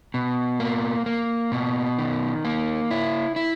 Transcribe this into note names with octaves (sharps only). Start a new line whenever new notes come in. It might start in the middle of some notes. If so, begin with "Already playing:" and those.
B2
A#3
A#3
B2
D#3
A#3
E4
E4